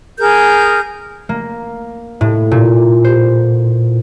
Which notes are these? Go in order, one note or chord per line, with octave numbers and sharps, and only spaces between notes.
G#4 A#4 G6
A#3
A2
A#2
C5